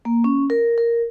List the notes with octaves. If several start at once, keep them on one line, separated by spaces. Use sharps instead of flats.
A#3
C#4
A#4
A#4